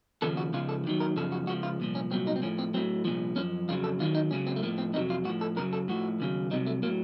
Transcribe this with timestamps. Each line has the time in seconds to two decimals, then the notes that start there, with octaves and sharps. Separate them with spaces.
0.22 D#2 C#3 F3 A4
0.37 F#4
0.53 C#2 C#3 F3 F4
0.69 A4
0.85 D#2 D#3 F#3
1.00 A#4
1.16 F#2 C#3 F3 A4
1.32 F#4
1.47 C#2 C#3 F3 F#4
1.63 F4
1.80 C2 A#2 F3
1.95 C#4
2.11 C2 A#2 F#3 C4
2.27 D#4
2.36 C4
2.42 A2 F3 C#4
2.59 C4
2.74 F#3 C4
2.77 A2
3.05 C2 A#2 F3
3.36 F#2 F3 C#4
3.69 F2 C#3 F#3 F4
3.84 A4
4.00 D#2 D#3 F#3 F4
4.15 D#4
4.31 C#2 C#3 F#3 C#4
4.47 C4
4.56 A3
4.62 A2 F3 A#3
4.78 C4
4.93 F2 C3 D#3 F#3 D#4
5.10 F4
5.25 A2 F#4
5.29 F3
5.41 A4
5.56 F#2 C#3 F#3 A#4
5.73 A4
5.88 A2 F3 F#4
6.20 D#2 C#3 F#3
6.51 C2 C3 F#3 D#4
6.67 A3
6.82 A2 F#3 A#3